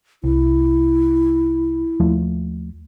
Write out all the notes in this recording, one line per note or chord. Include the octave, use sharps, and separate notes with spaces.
C2 E4
D#2 F3 A3